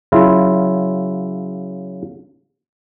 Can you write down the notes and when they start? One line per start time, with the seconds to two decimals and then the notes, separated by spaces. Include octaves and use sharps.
0.12 C#3 F#3 E4 F4